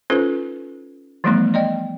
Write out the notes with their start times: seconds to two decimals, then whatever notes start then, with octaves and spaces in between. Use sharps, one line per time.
0.10 C#4 D#4 F4 A4 B4 C5
1.24 E3 F3 G3 A3 B3 D#4
1.54 D5 D#5 G5